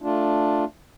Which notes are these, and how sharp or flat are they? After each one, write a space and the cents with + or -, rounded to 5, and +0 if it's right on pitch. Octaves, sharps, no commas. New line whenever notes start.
A3 +5 D4 +0 F4 +10